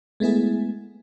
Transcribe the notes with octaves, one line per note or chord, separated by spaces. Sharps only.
G#3 A3 B3 E4 G#4